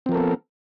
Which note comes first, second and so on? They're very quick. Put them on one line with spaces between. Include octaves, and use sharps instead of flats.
C4 F3 A#4 A4 B3